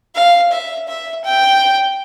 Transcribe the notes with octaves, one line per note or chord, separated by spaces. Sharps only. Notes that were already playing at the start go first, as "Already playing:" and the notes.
F5
E5
E5
G5